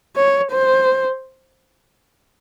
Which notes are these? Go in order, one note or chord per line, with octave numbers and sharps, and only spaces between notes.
C#5
C5